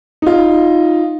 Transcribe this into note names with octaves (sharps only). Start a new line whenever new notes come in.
D#4 F4